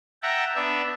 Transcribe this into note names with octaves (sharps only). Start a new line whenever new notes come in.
E5 F#5 G5 A5 A#5
B3 D4 E5